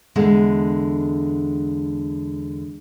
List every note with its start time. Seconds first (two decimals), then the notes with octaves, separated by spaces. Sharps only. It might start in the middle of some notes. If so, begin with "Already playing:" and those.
0.16 E2 D3 G#3